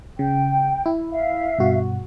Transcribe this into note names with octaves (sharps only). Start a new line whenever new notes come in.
C#3 G5
E4
E5 F5
G2 B2 F#4